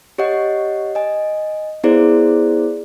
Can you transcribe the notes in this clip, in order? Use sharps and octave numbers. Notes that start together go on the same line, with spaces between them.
G4 C#5 D#5 F#5
D#5 G#5
B3 E4 G#4 C5 D5